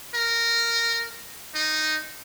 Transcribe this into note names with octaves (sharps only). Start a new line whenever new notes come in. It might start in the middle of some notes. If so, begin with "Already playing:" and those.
A#4
D#4